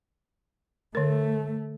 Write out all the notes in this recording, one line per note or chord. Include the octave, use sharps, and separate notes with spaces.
D3 A3 A#4